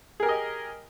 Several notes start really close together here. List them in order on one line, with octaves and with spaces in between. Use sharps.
G#4 A#4 G4 D#5